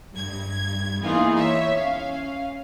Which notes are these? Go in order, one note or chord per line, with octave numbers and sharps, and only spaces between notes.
G2 G#6
E3 A#3 B3 D#4 F4 G#4
C#5 E5
C#4 F5